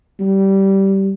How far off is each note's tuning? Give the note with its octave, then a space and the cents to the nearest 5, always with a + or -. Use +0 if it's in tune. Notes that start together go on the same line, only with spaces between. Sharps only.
G3 -15